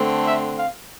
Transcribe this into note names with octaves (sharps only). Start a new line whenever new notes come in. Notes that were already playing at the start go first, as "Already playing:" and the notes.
Already playing: D3 A3 C4
E5
F5